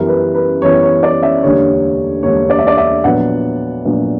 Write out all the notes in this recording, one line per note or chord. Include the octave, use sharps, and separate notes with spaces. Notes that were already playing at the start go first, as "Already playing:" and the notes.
Already playing: F#2 E3 G3 B3 E4 A#4
B4
B4
F#2 E3 G3 B3 E4 C#5
C#5
D5
E5
E1 D2 D3 G3 A#3 C#5
E1 D2 D3 G3 A#3 C#5
D5
E5
D5
E5
A#1 A#2 F#3 B3 F#5
A#1 A#2 F#3 B3